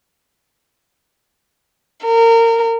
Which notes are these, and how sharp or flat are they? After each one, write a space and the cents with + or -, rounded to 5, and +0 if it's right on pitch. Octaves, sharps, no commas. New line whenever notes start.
A#4 -25